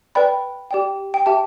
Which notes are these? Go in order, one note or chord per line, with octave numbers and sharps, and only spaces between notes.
B4 D5 G5 B5
G4 D5 G5
G5
G4 E5 G5 A5